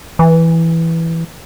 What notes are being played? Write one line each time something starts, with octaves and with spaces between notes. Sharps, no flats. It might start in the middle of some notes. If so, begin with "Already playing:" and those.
E3